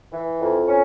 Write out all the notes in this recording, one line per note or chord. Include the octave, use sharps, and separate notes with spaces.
E3
F2
C#4